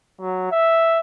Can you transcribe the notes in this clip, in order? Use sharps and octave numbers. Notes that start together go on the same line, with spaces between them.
F#3
E5